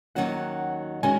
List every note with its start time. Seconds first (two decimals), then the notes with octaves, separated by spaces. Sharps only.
0.15 D#2 D#3 F#3 C#4 F#4 F#5
1.03 D#3 G#3 C#4 F#4 G#5